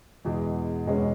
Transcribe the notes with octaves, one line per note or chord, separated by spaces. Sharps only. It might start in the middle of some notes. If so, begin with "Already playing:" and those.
E2 B2 G#3
E1 E2 B2 G#3 C#4